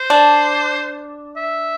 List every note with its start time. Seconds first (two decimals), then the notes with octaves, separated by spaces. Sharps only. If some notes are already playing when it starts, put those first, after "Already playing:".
Already playing: C5
0.10 D4
1.37 E5